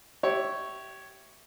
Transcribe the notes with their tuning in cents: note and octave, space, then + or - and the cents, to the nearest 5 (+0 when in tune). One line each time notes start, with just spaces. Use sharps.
G4 -25 C#5 +0 E5 +0